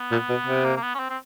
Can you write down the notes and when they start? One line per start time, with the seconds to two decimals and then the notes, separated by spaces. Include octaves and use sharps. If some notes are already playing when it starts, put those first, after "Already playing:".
Already playing: B3
0.11 A#2
0.29 B2
0.47 C3
0.64 A#3
0.77 A#3
0.82 B3
0.94 C#4
0.99 C4
1.10 C4